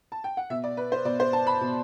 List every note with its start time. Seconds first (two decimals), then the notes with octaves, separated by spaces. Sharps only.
0.12 A5
0.24 G5
0.37 F#5
0.50 B2 E5
0.64 D5
0.77 B4
0.92 C5
1.05 B2 D5
1.20 C5
1.33 A5
1.47 B5
1.61 B2